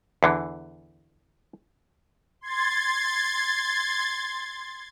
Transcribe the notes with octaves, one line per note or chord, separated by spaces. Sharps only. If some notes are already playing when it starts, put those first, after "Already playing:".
E2 D3 E3
C6 G#6 A6